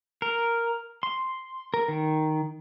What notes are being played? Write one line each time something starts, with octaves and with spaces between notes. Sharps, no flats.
A#4
C6
A#4
D#3